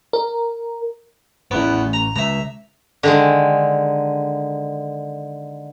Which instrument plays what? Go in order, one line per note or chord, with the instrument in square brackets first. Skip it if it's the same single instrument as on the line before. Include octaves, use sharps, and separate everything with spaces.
[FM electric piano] A#4
[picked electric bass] A1 C#4 [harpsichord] E2 B3
[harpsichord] A#5
[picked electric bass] C#3 G#3 [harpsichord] E5 A#5
[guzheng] D3 D#3 G#3